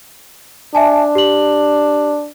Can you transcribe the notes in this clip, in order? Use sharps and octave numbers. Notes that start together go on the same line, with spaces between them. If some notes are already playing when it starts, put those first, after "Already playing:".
D4 E5 G#5 A5
G4 F#7